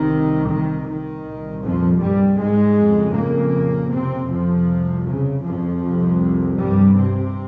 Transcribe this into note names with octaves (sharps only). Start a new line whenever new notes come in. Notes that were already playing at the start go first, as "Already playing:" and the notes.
Already playing: C2 C3 D#3
D#3
D#3
C2 A#2
F2 F3
G2 G3
G#2 G#3
F2 C#3
A#2 A#3
C3 C4
C2 F2 C3 F3
C#3
F2 F3
C2 C3
G2 G3
C3 C4